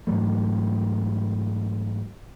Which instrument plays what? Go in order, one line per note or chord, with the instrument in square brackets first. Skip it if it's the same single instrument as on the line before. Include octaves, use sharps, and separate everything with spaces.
[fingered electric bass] G#2 E3 F#3 A3